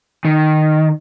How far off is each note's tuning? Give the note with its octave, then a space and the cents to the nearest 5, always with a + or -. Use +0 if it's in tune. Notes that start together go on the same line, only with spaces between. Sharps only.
D#3 -10